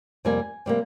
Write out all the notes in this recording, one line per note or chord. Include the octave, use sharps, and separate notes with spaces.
F2 C3 G3 A#3 G#5
C3 G3 A#3